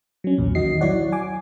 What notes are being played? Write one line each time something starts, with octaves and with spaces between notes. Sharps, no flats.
F#3 C#4
B1 E2 A#2
D#3 F#4 D#5 C7
F#3 E4 C#5 D5 F#5
G#5 D6